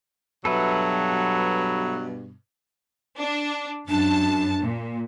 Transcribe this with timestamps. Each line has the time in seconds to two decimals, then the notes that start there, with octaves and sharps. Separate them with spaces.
0.45 G2 B2 F#3 A4 B4 E5
3.19 D4
3.89 F#2 D4 A5
4.61 A#2